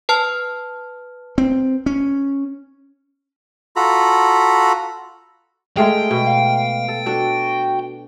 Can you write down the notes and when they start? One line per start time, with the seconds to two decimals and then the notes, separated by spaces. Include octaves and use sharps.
0.09 B4 A5 F6
1.38 C4
1.86 C#4
3.76 F4 F#4 A4 A#5 B5
5.77 G#3 A3 G#4 F5 G5
6.11 B2
6.27 F5
6.88 A4
7.06 D4 F#4 A4